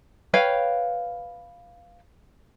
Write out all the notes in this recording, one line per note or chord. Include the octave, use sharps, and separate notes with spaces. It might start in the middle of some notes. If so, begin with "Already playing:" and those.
B4 C#5 F5 G5